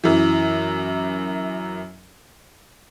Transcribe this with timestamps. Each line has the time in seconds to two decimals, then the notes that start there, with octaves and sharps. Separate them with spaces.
0.04 F#2 E3